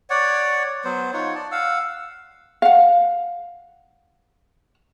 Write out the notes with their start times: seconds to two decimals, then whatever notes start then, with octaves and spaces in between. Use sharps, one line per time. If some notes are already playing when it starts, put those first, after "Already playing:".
0.10 C#5 D5 F#5
0.84 F#3 B3 C5
1.13 D#4 F4 C#5 F#5
1.35 D5 A5
1.52 F5 F#5 E6
2.62 F5 F#5